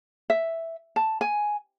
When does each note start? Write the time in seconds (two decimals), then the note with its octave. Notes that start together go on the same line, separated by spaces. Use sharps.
0.30 E5
0.96 A5
1.21 G#5